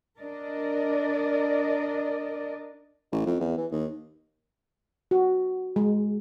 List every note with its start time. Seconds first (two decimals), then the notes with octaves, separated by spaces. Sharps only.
0.18 D4 A#4 D5 D#5
3.12 A1
3.26 F2
3.40 E2
3.57 E3
3.71 D#2
5.11 F#4
5.76 G#3